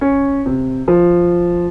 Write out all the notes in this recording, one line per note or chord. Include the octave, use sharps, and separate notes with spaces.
C#4
C3
F3